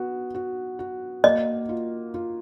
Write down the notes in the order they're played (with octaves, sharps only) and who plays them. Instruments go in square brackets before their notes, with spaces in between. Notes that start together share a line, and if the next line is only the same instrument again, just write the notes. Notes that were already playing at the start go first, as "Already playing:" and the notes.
Already playing: [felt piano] B3 F#4
F#4
F#4
[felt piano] A#3 [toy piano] D#5
[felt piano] F4
F4